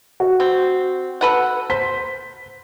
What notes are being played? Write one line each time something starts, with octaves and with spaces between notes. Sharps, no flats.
F#4
C4
A4 B4 F#5
C5 B6